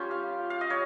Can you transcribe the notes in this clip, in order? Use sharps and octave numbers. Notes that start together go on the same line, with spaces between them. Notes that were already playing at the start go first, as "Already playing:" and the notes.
Already playing: G3 C#4 F4 G5
F5
F5
D#5
G3 C#5